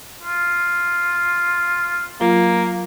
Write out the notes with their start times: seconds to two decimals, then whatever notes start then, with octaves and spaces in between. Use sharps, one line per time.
0.23 F4
2.21 F#3 A#3 F4